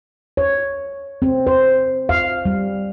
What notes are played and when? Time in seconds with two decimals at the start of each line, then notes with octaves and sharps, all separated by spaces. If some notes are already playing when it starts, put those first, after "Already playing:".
0.37 C#5
1.22 C4
1.47 C5
2.09 F5
2.45 G3